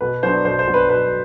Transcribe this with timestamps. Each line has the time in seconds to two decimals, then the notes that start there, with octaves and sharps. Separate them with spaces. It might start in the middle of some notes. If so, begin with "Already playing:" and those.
0.01 B2 B4
0.23 F#3 B3 D4 C5
0.45 B2 C5
0.59 C5
0.67 F#3 B3 D4
0.74 B4
0.89 B2 B4